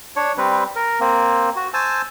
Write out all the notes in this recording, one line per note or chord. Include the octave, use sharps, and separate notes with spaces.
D4 C#5
G3 C4 B4
A#4
A#3 C4
F#4
C5 G#5 A5 E6